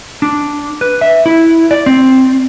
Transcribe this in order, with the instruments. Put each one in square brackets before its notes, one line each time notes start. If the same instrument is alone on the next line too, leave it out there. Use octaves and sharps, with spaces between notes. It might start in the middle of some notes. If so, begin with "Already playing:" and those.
[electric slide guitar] D4
B4
E5
E4
D5
C4